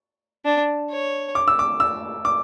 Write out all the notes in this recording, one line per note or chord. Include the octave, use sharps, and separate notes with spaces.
D4
C#5
D6
E6
D6
E6
D6